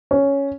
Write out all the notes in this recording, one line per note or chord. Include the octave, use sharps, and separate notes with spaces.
C#4